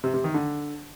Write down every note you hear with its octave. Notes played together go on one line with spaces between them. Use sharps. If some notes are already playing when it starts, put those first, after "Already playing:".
C3
C3
D#3
D3